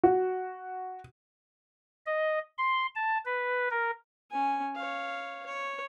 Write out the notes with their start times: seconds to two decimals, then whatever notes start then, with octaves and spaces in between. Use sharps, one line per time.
0.03 F#4
2.06 D#5
2.58 C6
2.95 A5
3.25 B4
3.71 A#4
4.31 C#4 G#5
4.75 C#5 F5
5.46 C#5